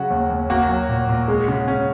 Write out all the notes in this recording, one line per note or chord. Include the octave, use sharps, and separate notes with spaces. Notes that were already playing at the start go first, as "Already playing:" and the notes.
Already playing: C#3 F#3 F#4
D#2
D#2
A#3 F#4
F#3
A#2
A#2
G#3
C#3
C#4